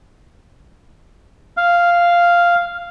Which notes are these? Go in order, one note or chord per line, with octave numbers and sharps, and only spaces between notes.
F5